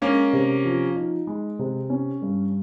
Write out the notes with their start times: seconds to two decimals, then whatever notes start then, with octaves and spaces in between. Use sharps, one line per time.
0.01 G#3 A#3 C#4
0.33 C3
0.65 F3
0.96 D#4
1.27 G#3
1.59 C3
1.90 C#4
2.22 G2